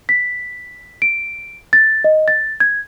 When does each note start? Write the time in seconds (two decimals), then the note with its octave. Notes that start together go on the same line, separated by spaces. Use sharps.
0.09 B6
1.02 D7
1.73 A6
2.04 D#5
2.28 A6
2.60 G#6